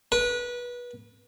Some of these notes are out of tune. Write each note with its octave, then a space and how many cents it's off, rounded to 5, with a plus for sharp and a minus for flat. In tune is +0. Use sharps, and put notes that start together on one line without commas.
B4 -25